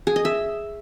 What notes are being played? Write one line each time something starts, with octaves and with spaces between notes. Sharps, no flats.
G#4
D#5
E5